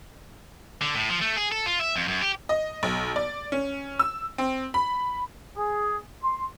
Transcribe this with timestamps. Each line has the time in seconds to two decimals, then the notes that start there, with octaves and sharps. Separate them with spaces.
0.82 D3
0.95 A2
1.09 F3
1.21 A3
1.36 G#4
1.52 A4
1.66 F4
1.80 E5
1.96 F2
2.08 F#2
2.22 G4
2.49 D#5
2.83 B1
3.16 D5
3.52 C#4
3.99 E6
4.38 C4
4.74 B5
5.57 G#4
6.23 C6